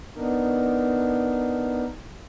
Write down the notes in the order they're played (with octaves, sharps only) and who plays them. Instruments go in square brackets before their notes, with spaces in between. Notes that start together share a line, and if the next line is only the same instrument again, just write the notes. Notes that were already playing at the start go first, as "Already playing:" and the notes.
[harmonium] B3 D4 D#4 A#4